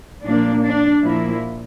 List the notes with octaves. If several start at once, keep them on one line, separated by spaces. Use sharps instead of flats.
A#2 F3 A#3 D4
D4
A#2 F3 A#3 E4